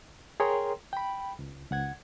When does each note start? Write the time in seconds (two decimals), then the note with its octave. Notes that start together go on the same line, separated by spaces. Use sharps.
0.40 G#4 A#4 C#5 G5 A#5 C6
0.93 G5 B5
1.39 C#2
1.71 C#2 F#5 G#6